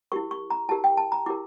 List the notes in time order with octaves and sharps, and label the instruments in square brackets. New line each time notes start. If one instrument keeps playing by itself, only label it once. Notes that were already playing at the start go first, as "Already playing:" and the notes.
[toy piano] E4 G4 A#4 C#6
C#6
A#5
E4 G4 A#4 A5
G5
A5
A#5
E4 G4 A#4 D6